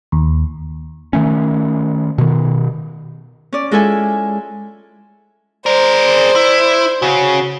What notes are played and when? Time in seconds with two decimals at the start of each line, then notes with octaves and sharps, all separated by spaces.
0.12 D#2
1.13 D#3 A3 C#4
2.18 B2 D#3
3.53 C#4 D5
3.71 G#3 E4 F4 A4 E5 G#5
5.66 G#4 A#4 C5 D5
6.36 E4
7.02 C#3 F#4